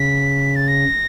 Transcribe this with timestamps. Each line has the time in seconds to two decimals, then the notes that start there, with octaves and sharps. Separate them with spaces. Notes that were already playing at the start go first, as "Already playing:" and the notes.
Already playing: C#3 B6
0.56 A6
0.68 A#6